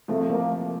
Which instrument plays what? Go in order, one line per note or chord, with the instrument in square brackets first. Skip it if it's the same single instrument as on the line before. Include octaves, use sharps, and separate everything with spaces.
[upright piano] C3 F3 G#3 [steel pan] A3
[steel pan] A#3